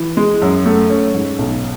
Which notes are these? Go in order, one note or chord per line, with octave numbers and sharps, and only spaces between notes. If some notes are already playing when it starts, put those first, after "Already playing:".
Already playing: E3
G#3
F#2
A3
C#4
G#2
B1